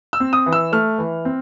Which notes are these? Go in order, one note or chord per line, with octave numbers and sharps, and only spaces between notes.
E6
C4
D#6
E3
E6
A3 F6
E3
C4